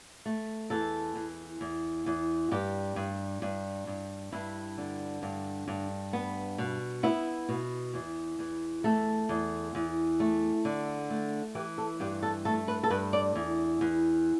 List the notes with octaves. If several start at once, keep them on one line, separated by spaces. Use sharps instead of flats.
A3
E2 A4
E2
E2
E2
G2 G4
G2
G2
G2
G2 E4
D3
G2
G2
B3
B2
B3 E4
B2
E2
E2
A3 A4
E2
E2
A3
D3
A3
E3 G4
A4
G2 G4
A4
A3 A4
B4
A4
G2 B4
D5
E2
E2